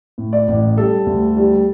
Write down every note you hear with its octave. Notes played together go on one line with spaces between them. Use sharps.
A2
D5
A1
G3 A4
D2
G3